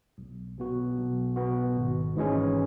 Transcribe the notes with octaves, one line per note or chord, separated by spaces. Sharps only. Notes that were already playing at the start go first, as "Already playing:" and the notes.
B1
B2 B3 F#4
B1
B2 B3 F#4
G#1
G#2 E3 G#3 C#4